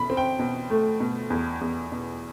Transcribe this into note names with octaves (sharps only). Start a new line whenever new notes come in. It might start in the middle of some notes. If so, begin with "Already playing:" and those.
Already playing: B2 B5
C4
G5
B2
A3
B2
E2
E2
B2